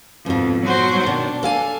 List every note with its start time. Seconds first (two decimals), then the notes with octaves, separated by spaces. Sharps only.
0.26 F2 G#2 B2
0.64 F#3 F#4 C5
1.03 B2 D#3 D4
1.43 A4 F5 G#5